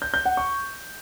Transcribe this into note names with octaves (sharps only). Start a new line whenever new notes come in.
G6
G6
F#5
C#6